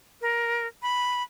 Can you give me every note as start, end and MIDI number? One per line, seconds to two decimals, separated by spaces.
0.21 0.66 70
0.82 1.23 83